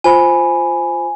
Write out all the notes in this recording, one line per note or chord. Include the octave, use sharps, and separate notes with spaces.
F4 C5 G#5 B5